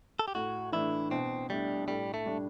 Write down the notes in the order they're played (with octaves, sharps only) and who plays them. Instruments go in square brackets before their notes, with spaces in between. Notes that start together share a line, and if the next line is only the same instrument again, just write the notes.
[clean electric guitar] A4
G4
[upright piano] A2 [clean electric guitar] F#4
[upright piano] E3 A3 D4 [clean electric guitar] E4
[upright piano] B2 [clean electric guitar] C4
[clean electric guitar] G3 [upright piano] A3 D4
[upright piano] A2 [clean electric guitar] G3
[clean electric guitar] A3
[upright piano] G3 D4